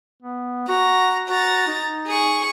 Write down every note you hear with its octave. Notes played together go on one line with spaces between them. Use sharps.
B3
F#4 A#5
F#4 A#5 A6
D#4
G#4 C#6